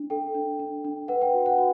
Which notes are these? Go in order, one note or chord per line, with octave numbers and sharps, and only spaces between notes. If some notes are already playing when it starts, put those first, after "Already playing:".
Already playing: D4
A4 G5
D4
D4
D4
B4 F#5
G5
F#4
F#5
F#4